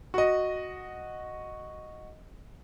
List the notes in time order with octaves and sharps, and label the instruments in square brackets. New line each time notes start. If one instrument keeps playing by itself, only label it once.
[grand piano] F#4 D#5